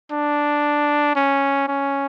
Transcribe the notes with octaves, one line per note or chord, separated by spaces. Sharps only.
D4
C#4
C#4